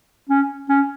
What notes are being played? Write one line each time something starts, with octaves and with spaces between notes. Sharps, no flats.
C#4
C#4